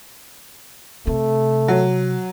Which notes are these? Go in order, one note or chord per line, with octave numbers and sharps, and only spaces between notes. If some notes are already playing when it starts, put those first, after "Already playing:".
C3 A3
F#3